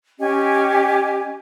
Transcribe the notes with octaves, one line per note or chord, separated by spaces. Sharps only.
C#4 G4 D#5 G#5